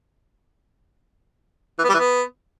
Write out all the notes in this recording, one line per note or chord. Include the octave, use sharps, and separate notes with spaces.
E3
B3
G3
E3
B3